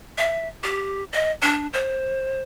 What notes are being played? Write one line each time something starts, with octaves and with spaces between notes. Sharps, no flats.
E5
G4
D#5
D4
C5